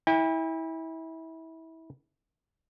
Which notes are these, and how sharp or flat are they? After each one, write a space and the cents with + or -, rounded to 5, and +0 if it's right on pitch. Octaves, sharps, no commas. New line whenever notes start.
E4 -25 G5 +45